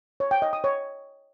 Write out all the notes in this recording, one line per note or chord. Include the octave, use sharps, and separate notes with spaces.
C#5
G5
D#5
D#6
C#5